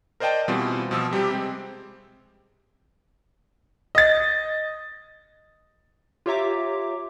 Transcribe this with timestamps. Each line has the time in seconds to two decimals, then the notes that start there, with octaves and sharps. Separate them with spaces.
0.20 A#4 C5 D5 D#5 G5 A5
0.48 B2 E3 G3 C4 F4
0.91 B2 F3 E6
1.11 C3 G3 C4 G4
1.31 G#3 C4
3.95 D#5 A6
6.26 F4 G4 C#5 E5 A#5 D6